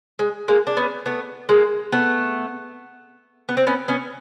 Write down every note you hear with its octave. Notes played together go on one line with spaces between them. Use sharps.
G#3
G#3 A#3
D4
B3 C#4
A3 B3
G#3 A#3
A3 B3
B3
C4
B3 C#4
B3 C#4